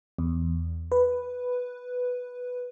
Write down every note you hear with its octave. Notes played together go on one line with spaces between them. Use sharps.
E2
B4